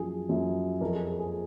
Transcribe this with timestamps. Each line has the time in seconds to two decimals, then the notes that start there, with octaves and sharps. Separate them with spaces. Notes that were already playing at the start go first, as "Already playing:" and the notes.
Already playing: F#2 F3 G#4
0.29 F#2 F3
0.81 F2 F3 A#4
0.94 G#4
1.07 G#4
1.19 G#4